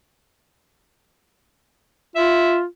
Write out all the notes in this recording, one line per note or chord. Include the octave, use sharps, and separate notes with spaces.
F4 E5